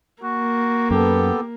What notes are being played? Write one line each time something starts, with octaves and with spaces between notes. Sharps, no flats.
A#3 F#4
F#2 B3 G4 A4